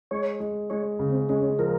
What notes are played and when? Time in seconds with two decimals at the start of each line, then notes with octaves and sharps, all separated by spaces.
0.11 G#3 C#5
0.40 G#3
0.70 G#3 C#5
0.99 C#3
1.09 C4
1.29 G#3 C#4
1.59 F3 A#4